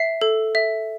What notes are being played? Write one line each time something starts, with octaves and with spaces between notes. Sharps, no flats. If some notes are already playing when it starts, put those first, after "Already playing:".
Already playing: E5 C7
A4
E5